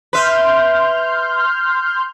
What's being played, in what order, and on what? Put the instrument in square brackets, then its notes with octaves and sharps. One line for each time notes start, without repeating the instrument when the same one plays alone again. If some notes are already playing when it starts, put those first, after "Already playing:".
[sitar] B4 E5 [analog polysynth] C6 F6 G6